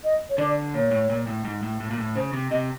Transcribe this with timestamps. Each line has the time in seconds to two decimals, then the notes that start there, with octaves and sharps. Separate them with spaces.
0.04 D#5
0.29 C#5
0.38 D3 D5
0.74 A#2 C#5
0.91 A2
1.10 A#2
1.27 A2
1.45 G#2
1.63 A2
1.80 A2
1.90 A#2
1.98 A2
2.16 C#3 C5
2.33 C3
2.50 C3 D#5